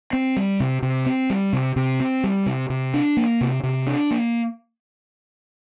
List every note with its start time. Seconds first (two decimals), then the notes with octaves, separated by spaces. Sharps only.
0.13 C4
0.36 G3
0.60 C3
0.82 C3
1.06 C4
1.30 G3
1.53 C3
1.76 C3
2.00 C4
2.23 G3
2.46 C3
2.70 C3
2.94 D4
3.17 A#3
3.41 C3
3.63 C3
3.87 D4
4.11 A#3